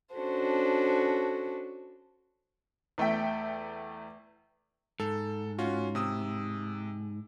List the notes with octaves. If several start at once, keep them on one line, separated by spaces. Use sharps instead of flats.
C#4 D4 F#4 A4 C5
E2 A3 E5 G5 B6
G#2 A4
C#4 F4 F#4
C3 D#6 E6